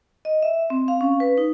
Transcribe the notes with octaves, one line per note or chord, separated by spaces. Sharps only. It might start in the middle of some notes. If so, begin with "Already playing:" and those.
D#5
E5
C4
F5
C#4
B4
D#4